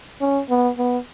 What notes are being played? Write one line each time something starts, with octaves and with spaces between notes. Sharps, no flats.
C#4
B3
B3